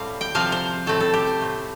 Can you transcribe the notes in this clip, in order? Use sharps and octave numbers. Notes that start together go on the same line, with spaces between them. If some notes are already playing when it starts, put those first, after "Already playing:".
Already playing: A2 G3 C4 G4 C5 F5
G5
C3 F3 C4 F5
C5
A2 A3 C4 A4
A4
G4
C5
A2 A3 C4